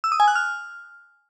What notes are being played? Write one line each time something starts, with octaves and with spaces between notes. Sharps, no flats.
E6
D#6
G#5
F#6
F6